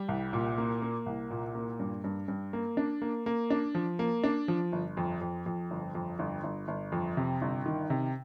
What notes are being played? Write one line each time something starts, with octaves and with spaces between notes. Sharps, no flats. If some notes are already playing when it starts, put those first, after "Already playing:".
Already playing: G3
C2
A#2
A#3
A#3
C2
A#2
A#3
G2
G2
G2
A#3
D4
A#3
A#3
D4
F3
A#3
D4
F3
G1
F2
F2
F2
G1
F2
G1
G1
G1
F2
C3
G1
D#3
C3